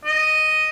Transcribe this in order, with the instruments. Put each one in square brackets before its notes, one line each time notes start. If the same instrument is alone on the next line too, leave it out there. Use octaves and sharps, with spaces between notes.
[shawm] D#5